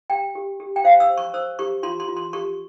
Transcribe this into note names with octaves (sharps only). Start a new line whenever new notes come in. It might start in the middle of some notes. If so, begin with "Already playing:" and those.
G4 G5
G4
G4
G5
C5 F5
E6
C5
C#6
C5 E6
G4 C#6
F4 C6
C6
F4
C6
G4 C#6